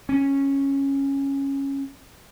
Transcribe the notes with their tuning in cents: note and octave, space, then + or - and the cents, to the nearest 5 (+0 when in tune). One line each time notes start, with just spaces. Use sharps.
C#4 -10